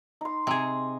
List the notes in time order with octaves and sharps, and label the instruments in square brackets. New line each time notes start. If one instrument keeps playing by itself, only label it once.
[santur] D#4 C6
[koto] C3 G#4 [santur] D#5